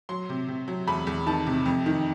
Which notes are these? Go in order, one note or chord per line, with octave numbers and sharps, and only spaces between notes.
F#3 C6
C3
C3
F#3
E2 B5
E2
D#3 A5
C3
F2
D#3